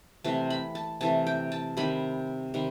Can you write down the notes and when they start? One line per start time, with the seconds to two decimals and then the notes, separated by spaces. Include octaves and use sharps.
0.24 C3 E3 A3 A5
0.50 B5
0.75 A5
1.01 C3 E3 A3 A5
1.27 G5
1.52 A5
1.77 C3 D#3 G3 B5
2.54 C3 D#3 G3